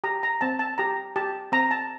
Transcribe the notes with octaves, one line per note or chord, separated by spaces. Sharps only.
G4 A#5
A#5
C4 A5
A5
G4 A#5
G4 A5
C4 A#5
A5